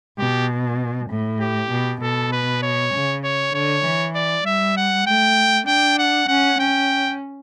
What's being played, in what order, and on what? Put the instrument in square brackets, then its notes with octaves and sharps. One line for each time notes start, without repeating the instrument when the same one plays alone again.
[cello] B2 [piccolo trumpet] G4
[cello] A2
[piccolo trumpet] G4
[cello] B2
[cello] B2 [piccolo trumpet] A4
[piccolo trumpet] B4
C#5
[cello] C#3
[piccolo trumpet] C#5
[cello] D3 [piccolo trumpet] C#5
[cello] E3
[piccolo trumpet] D5
[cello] G3 [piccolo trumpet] E5
[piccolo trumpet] F#5
[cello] A3 [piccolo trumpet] G5
[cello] D4 [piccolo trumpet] G5
[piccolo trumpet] F#5
[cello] C#4 [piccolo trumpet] F#5
[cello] C#4 [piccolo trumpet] G5